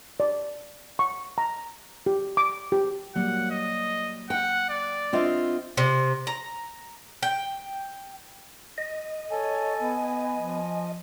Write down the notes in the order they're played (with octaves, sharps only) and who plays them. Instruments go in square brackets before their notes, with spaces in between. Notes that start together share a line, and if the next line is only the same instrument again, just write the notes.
[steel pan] D5
C#6
A#5
G4
D6
G4
[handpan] F#3 A#3 [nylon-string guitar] G3 [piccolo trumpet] F#5
[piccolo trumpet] D#5
[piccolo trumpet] F#5 [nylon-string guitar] G5
[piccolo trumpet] D5
[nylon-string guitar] C4 F4 [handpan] D4 D#5 E5
[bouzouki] C3
A#5
G5
[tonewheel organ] D#5
[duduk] A4 [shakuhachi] C#5 [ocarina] G#5
[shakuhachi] B3
[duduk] F3